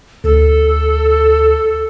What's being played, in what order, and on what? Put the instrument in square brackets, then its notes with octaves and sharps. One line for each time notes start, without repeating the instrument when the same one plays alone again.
[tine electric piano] D2 [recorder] A4